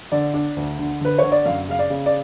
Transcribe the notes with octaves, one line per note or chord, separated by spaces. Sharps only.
D3 D5
D4
D2
D3
D3 B4
D3 C#5
D5
F#2 F5
C#3 F5
D5
C#3
D5